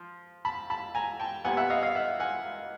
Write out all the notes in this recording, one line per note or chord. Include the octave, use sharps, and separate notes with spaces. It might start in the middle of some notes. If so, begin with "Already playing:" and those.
Already playing: F3
A5 B5
A5 B5
G#5 A#5
G5 A5
A#2 G3 B3 F#5 G#5
E5 F#5
D#5 F5
D#5 F5
E5 F#5
F#5 G#5